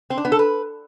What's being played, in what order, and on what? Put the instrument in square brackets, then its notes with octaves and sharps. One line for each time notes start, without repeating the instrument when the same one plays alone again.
[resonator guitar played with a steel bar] C4
D4
B3
A4
B4